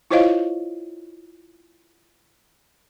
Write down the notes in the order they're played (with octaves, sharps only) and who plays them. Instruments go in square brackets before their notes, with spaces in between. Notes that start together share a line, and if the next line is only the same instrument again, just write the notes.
[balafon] E4 F4 C5 C#5 D#5 F5